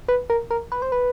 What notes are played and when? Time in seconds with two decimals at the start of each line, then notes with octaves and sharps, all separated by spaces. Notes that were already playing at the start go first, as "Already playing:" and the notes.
0.08 B4
0.30 A#4
0.51 A#4
0.72 B4
0.82 C5
0.92 B4